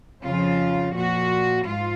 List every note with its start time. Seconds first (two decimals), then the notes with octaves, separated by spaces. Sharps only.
0.25 F2 C#3 F3 F4
0.95 A#2 F3 F#4
1.66 G#2 F4